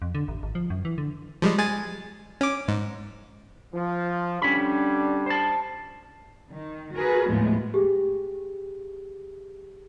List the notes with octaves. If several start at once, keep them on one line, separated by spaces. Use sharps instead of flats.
F2
D3
A1
G#1
F3
F#2
E3
D3
F3 G3 G#3
G#3 G#5 A6
C#4 D6
G#2
F3
D3 G3 C#4 D4 B5
C5 A5
D#3
F#4 G#4 A#4 B4
D#2 A2 F3 G#3 A3 B3
G4 G#4